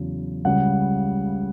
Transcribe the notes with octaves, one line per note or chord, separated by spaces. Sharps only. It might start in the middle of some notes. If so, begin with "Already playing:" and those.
Already playing: E2 C#3 F#3
C#2 C#3 G3 F#5